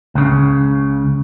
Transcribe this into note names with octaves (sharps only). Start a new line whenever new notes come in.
C#2 C#3